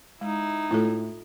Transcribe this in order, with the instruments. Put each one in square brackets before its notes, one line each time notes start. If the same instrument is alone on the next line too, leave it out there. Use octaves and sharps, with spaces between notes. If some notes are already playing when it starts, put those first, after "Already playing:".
[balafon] G#3 [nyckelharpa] D#4 E4
[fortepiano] A2 [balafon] F4 A4